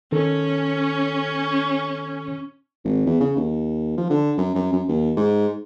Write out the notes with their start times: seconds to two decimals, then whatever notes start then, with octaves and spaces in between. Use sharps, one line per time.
0.12 D#3 C#4 A4
2.85 G#1
3.06 E2
3.20 C#3
3.37 D#2
3.97 F3
4.10 D3
4.37 F#2
4.55 F#2
4.72 F#2
4.88 D#2
5.17 G#2